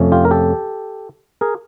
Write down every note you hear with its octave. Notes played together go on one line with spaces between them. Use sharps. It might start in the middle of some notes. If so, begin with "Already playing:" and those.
Already playing: F2 C3 F3 A3 C#4
F4 G4
A#4
G4 A4
G#4 A#4